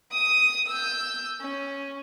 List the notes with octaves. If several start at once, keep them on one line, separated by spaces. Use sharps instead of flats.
D#6 D#7
E6 G6
C#4